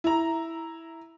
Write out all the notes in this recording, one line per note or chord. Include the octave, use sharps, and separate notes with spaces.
E4 A#5